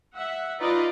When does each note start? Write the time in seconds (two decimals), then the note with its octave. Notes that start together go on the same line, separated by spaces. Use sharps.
0.15 E5 F#5
0.59 D#4 F4 B4 D5 D#5 F5